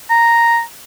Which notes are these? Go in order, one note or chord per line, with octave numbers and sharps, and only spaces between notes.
A#5